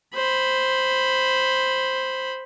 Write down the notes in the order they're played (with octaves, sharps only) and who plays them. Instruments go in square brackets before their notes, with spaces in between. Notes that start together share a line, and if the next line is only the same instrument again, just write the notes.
[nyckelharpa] C5 B5